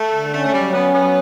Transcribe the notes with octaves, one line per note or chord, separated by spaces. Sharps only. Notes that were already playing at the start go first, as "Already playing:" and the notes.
Already playing: A3 A4
D3
A3 C#4
A3
F#3 G3
B3 C#4
F#3 B3